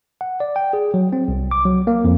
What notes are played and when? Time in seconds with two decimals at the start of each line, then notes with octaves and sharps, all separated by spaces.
0.21 F#5
0.40 D5
0.56 G5
0.73 G#4
0.94 F#3
1.13 C4
1.28 C2
1.51 D6
1.65 F#3
1.87 A#3
2.04 F2